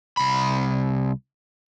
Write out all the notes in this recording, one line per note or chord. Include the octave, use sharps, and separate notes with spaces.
C2 B5